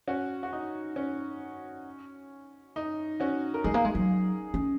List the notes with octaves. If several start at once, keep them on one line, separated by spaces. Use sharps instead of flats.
C#4 F#4
F#4
D#4
C#4
D#4
C#4 F#4
A#4
G#3 D#4 G#4
A#3
G#3
F#3
C#4